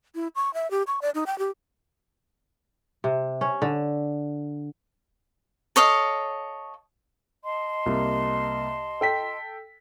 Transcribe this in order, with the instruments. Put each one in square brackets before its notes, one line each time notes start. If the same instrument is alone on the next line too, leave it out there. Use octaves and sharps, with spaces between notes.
[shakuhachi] E4
C#6
E5
G4
C#6
D5
D#4
G5
G4
[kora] C3
C#4
D3
[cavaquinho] A4 C#5 D#5 F5
[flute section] D#5 A5 C6
[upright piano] C2 A#3
A4 G5 B6